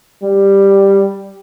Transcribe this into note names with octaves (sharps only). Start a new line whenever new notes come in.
G3